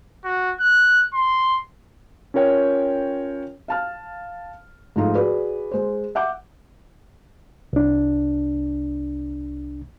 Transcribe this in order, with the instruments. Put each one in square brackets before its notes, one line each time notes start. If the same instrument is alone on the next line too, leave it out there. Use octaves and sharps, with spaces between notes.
[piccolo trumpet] F#4
F#6
C6
[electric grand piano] C#4 F4 A#4 C#5 G5
[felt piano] F5 A5 F6
G#2 F3 A3 D#4 F4
F#4 G#4 B4 D5
G#3 C5
E5 F#5 D6 G6
[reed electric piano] C2 D4